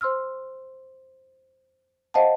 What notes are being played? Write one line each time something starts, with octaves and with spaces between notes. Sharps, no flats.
C5 C6 E6 F6
C5 D#5 F5 F#5 A5